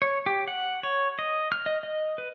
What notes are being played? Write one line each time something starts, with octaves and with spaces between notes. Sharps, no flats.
C#5
G4
F#5
C#5
D#5
F6
D#5
D#5
B4